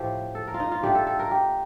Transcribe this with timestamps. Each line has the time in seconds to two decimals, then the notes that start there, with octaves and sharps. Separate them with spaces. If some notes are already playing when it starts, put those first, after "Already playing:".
Already playing: A2 F3 A3 G4
0.35 A4
0.48 A#4
0.54 F4
0.60 D#4
0.72 F4
0.83 D#3 A3 D4 G4
0.95 A4
1.07 A4
1.19 A#4
1.31 G4